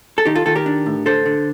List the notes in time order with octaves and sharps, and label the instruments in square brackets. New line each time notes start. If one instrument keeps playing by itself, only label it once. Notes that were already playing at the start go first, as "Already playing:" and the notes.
[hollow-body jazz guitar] A4
D#3 D#4 G4
F4 A4
D#3 F4 A4
G4 A#4
D4
A2
D3 A4 C5
D3